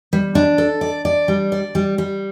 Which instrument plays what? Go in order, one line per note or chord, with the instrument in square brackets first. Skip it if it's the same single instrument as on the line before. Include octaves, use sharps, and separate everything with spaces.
[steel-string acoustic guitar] G3
D4
A4
D5
D5
G3
D5
G3
G3